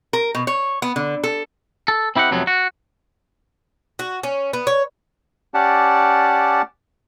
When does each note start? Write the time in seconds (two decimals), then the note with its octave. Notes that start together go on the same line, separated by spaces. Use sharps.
0.13 A#4
0.35 B2
0.47 C#5
0.82 B3
0.96 D3
1.24 A4
1.88 A4
2.16 C4 E4 G4 D#5 F#5
2.31 F2 C3 F#3 A3 B3
2.47 F#4
3.99 F#4
4.23 C#4
4.53 B3
4.67 C#5
5.54 C#4 G4 D5 F#5 A5